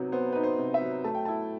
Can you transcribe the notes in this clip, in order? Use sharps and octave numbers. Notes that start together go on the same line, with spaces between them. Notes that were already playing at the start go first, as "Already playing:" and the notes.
Already playing: C3 F#3 B3 D#4
B3 C5
D#4 B4
C5
C3
E5
F#3
A3 A5
G5
E4 A5